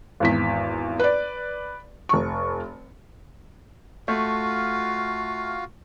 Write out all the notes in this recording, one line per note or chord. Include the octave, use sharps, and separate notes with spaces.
G#1 E2 B6
B4 D5
F1 C#6
A3 F4 F#4 F5